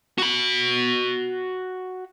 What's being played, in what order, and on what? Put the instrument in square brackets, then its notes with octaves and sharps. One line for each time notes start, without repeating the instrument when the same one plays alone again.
[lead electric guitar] F#4 B5